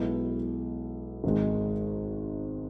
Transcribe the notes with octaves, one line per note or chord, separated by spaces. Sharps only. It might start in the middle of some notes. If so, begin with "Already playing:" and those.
Already playing: B1 B2 G#3 B3 E4
G#1 G#2 D#3 G#3